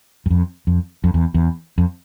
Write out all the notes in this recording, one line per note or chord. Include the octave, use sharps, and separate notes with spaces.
F#2
F2
F2
F2
E2
E2
F2